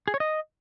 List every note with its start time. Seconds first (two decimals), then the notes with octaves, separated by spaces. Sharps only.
0.08 G#4
0.14 C#5
0.20 D#5